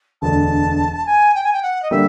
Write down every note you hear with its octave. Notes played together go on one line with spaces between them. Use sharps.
E1 D2 D3 A5
G#5
G5
G#5
G5
F#5
D#5
D3 G3 A#3 E5